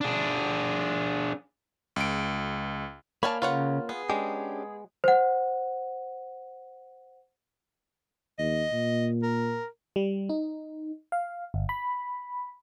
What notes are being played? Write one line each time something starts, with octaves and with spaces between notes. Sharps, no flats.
D4 G#4
C#2 D7
A#3 C#5 D5 F5 G#5 A5 B5
C#3 F4 B4 C#5 F#5
B3 G#4
G#3 C#4 D4 G4
C5 F#5
D#2 D#5
A#2
A#4
G3
D#4
F5
G1
B5